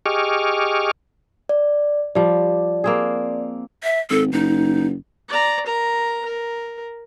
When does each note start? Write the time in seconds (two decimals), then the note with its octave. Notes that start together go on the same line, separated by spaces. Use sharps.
0.06 G4 G#4 D#5 C#6 D6 F6
1.49 D5
2.15 F3 G3 D5
2.84 A#3 C4 G#4
3.84 E5
4.10 G#1 A4
4.33 F#1 D#4
5.29 D5 A#5
5.66 A#4 A#5
6.25 A#4